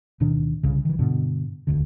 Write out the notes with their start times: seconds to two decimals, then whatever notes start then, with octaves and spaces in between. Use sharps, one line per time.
0.20 D1 B2 D#3 D4
0.63 C2 C#3
0.85 D#3 E3
0.99 G2 B2 D3
1.67 E1 D2 D3